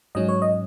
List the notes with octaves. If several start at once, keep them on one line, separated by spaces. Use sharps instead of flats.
G#2 F#3 C#4 D#5
C#5
D#5